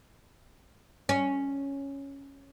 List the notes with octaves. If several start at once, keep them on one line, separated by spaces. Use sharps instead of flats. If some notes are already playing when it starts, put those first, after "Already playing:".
C#4